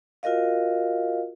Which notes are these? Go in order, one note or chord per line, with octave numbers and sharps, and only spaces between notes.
F4 F#4 A#4 D#5 F5